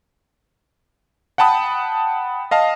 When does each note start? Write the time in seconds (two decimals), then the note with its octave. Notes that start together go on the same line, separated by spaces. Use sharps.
1.38 F#5 G5 A5 B5 D#6
2.51 D#5 F5 A5